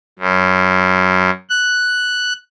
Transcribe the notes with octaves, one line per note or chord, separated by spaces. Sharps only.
F#2
F#6